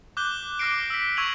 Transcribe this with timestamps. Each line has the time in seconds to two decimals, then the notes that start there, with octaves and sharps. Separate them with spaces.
0.17 D6 F#6 G6 G7
0.59 D6 F6 A#6 C7 D7
0.90 E6 B6
1.17 C#6 E6 G#6 D#7 F7 F#7